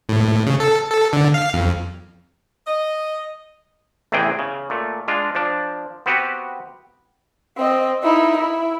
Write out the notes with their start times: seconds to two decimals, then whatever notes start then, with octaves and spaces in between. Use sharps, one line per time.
0.09 A2
0.46 C#3
0.60 A4
0.90 A4
1.13 D3
1.34 F5
1.54 F2
2.67 D#5
4.12 A1 E2 C3 E3 G#4 G5
4.39 C#3
4.70 A#2 A3
5.08 G#3 D4 F4
5.35 F3 D4
6.06 B3 C4 F#4 G4 B4 F#5
7.58 C4 D#5
8.03 D#4 E4
8.38 E4